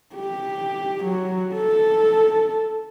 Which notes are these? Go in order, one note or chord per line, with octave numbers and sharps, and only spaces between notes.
G4
F#3
A4